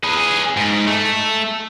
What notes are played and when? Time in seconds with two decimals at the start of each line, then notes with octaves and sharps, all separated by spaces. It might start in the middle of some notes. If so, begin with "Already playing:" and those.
0.04 G#4 B4
0.57 G#2
0.88 A3